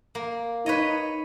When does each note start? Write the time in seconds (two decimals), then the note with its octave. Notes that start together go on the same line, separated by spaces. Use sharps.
0.15 A#3
0.66 D#4 B4 C#5 D#5